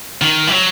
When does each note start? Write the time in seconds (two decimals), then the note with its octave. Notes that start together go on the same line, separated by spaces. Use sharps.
0.22 D#3
0.47 E3
0.51 F#3